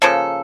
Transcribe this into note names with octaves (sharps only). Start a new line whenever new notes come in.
C#3 F3 A#3 A4